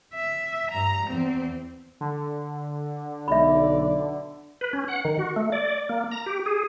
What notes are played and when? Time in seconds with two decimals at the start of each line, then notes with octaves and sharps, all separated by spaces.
0.14 E5
0.71 G2 A#5
1.06 E2 C4
2.01 D3
3.28 B1 D5 E5 B5
4.61 B4
4.73 C#4
4.88 F#5
5.05 D#3
5.18 F#4
5.36 A3
5.52 D5
5.89 A#3
6.12 A#5
6.26 G4
6.46 G#4